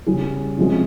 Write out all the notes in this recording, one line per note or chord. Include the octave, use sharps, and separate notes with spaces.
C#3 G3 C#4 G#4
C3 F3 G#3 C#4 G#4